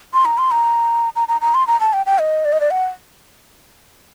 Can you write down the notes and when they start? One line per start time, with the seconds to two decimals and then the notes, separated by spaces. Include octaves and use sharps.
0.14 C6
0.25 A#5
0.38 C6
0.51 A#5
1.16 A#5
1.28 A#5
1.41 A#5
1.54 C6
1.67 A#5
1.80 A5
1.93 G5
2.06 G5
2.19 D#5
2.45 D5
2.53 D#5
2.61 D5
2.71 F#5